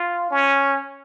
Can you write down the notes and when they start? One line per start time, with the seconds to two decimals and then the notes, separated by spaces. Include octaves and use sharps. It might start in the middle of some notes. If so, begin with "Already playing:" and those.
Already playing: F4
0.31 C#4